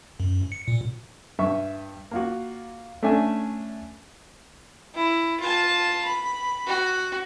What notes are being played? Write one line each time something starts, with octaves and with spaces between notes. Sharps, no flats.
F#2
C#7
A#2
G2 E5 C#6
A#3 F4 F#4
A3 C#4 D4 E5 G#5
E4
F4 A5
B5
F#4